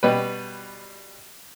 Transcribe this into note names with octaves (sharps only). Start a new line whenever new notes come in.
B2 G3 B4